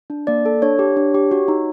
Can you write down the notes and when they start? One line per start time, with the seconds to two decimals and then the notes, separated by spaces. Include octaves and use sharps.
0.10 D4
0.27 A#3 D5
0.46 A4
0.62 D4 C#5
0.79 G4
0.97 D4
1.14 G4
1.31 F#4
1.48 D#4